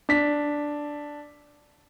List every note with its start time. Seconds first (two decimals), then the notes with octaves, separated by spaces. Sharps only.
0.09 D4 B6